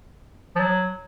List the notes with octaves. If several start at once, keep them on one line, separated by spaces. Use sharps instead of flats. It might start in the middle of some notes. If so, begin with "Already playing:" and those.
F3
F#3